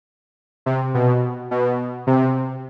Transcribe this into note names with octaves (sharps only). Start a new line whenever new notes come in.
C3
B2
B2
C3